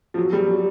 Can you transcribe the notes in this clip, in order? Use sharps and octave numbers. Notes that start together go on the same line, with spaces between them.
F3
F#3
G3
F#3